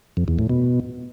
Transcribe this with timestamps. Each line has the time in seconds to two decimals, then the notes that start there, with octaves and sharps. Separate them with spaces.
0.17 F2
0.28 E2
0.39 A2
0.49 B2